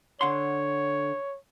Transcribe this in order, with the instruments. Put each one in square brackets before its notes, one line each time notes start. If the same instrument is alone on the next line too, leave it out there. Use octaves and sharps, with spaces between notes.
[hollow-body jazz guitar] D3 F#5 C6 [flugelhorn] C#5